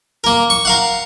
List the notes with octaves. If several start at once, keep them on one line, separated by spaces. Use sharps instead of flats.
A#3 A#4
C#6
A#4 F5 F#5